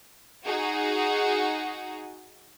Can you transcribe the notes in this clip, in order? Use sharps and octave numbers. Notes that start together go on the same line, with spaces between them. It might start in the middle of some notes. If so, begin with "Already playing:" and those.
D#4 F#4 G#4